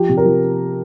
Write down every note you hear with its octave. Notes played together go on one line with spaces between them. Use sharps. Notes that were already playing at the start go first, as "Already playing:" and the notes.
Already playing: F3 G4
C3
A#4
F3